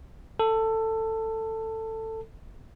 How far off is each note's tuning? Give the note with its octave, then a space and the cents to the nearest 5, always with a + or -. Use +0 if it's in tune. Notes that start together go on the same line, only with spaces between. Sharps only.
A4 +15